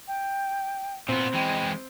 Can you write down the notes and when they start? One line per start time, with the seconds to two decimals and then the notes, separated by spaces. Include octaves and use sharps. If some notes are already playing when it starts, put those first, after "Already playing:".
0.07 G5
1.09 A#2 B3 C4
1.34 E3 G#3 G5